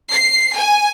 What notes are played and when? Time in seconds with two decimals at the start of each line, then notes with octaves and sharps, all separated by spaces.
0.12 C7
0.56 G#5